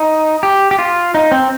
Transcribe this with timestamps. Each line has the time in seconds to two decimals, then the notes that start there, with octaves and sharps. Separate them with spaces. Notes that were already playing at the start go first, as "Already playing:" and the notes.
Already playing: D#4
0.43 G4
0.71 G4
0.79 F4
1.14 D#4
1.32 C4